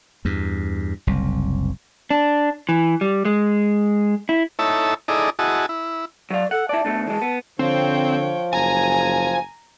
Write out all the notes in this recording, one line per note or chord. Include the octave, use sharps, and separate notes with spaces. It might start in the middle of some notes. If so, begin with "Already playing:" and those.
E2 G2
F#1 C2
D4
E3
G3
G#3
E4
D#4 E4 A4 C#5 E5 A5
D#4 E4 G#4 A4 D5 D#5
E4 F#4 G#4 D#5 A5
E4
F#3 D5 F5
A4 F#5
E4 D5 A5
B2 A3 D4
E3 G#3 A5
B3
D3 F3 C4 C#5 G5
F#1 G#5 A#5